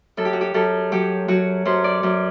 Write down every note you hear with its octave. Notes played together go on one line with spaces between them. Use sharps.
F#2 A4
G4
F#4
G4
F#2 A4
F#3 G4
F#3 F#4
F#2 C5
D5
F#2